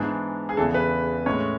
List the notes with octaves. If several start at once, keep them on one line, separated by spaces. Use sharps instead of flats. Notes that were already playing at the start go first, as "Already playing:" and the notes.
Already playing: G#2 E3 B3 D4 G#4
G#4
E2 C#3 E3 A4
B4
A2 G#3 C#4 C#5